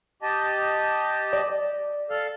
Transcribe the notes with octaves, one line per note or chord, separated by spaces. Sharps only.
G4 D#5 A5
D5
A4 F5